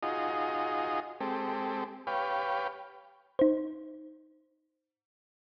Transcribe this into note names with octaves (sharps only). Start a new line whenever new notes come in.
D#4 F4 F#4 G#4 D#5
G#3 C4 G4 A4
G4 B4 C#5 F5 G5
D#4 C5